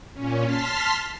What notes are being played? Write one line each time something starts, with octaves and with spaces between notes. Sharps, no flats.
A#2 C#4
A5 C6 F6 B6